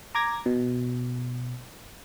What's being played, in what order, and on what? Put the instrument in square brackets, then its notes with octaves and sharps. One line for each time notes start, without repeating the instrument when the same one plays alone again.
[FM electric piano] A#5 D6 G#6 A#6
B2